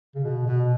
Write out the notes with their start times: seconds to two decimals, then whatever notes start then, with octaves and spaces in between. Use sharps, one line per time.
0.15 C#3
0.24 B2
0.47 B2